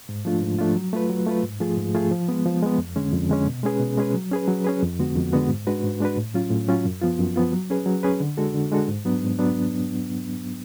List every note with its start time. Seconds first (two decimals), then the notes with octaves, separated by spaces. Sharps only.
0.09 G#2
0.25 F3 A3 D4 F4
0.42 G#2
0.59 F3 A3 D4 F4
0.75 F#3
0.93 A3 F4 B4
1.10 F#3
1.27 A3 F4 B4
1.43 G#2
1.60 F3 A3 F4 G#4
1.77 G#2
1.94 F3 A3 F4 G#4
2.11 F3
2.29 G#3 B3
2.45 F3
2.62 G#3 B3
2.78 F2
2.96 D3 G#3 C#4
3.13 F2
3.29 D3 G#3 C#4
3.47 B2
3.63 G#3 C#4 G#4 B4
3.80 B2
3.97 G#3 C#4 G#4 B4
4.14 F#3
4.31 C#4 G#4 B4
4.48 F#3
4.65 C#4 G#4 B4
4.82 F2
4.99 D3 G#3 B3 F#4
5.15 F2
5.33 D3 G#3 B3 F#4
5.49 G#2
5.67 G#3 D4 F#4 B4
5.84 G#2
6.01 G#3 D4 F#4 B4
6.17 A2
6.34 F#3 C#4 F4
6.51 A2
6.68 F#3 C#4 F4
6.85 F#2
7.02 F3 B3 F4
7.18 F#2
7.36 F3 B3 F4
7.52 F#3
7.70 C#4 G#4 B4
7.86 F#3
8.03 C#4 G#4 B4
8.20 D3
8.37 G#3 D4 F#4 A4
8.54 D3
8.72 G#3 D4 F#4 A4
8.88 G#2
9.05 F#3 B3 D4
9.22 G#2
9.39 F#3 B3 D4